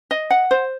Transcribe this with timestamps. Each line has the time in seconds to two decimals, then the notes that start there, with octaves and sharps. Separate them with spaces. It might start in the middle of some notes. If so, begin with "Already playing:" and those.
0.11 D#5
0.31 F#5
0.51 C5